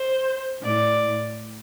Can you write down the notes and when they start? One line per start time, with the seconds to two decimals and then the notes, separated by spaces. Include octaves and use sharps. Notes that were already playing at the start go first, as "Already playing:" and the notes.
Already playing: C5
0.62 A2 D5